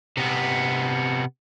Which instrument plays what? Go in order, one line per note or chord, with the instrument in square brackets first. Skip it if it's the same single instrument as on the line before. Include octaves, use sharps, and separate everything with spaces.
[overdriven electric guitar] C3 B3